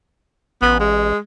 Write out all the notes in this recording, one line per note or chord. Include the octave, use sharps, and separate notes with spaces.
A1 B3
G#3